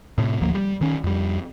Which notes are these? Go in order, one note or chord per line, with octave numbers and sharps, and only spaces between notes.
A2 C3
A1 D2 F3 A#3
G3
D#3 C#4
F2 G3